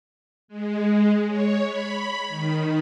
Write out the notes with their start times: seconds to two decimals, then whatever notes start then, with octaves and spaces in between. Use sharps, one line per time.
0.48 G#3
1.28 C#5
1.66 B5
2.28 D#3